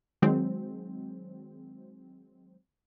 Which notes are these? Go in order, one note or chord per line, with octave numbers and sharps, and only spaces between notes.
D#3 F#3 G#3 C4